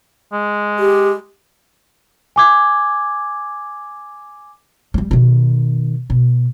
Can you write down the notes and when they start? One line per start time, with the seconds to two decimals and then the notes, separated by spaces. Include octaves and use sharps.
0.33 G#3
0.79 G4
2.36 G#5 D6 G#6
4.94 F#3 G3
5.11 B2 D#3
6.10 B2